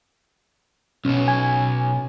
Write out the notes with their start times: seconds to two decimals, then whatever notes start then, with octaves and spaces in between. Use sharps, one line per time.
1.05 B1 B2 C#4
1.28 G#5